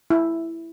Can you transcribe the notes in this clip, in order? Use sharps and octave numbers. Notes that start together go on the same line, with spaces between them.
E4